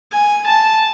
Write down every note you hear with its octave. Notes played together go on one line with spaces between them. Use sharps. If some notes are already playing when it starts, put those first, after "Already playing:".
G#5
A5